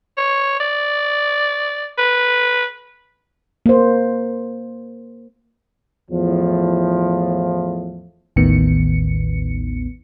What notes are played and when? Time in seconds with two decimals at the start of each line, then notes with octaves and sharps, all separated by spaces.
0.18 C#5
0.60 D5
1.98 B4
3.66 A#3 C5
6.11 E2 A2 F3
8.36 A1 D#2 A2 D#3 B3 C#7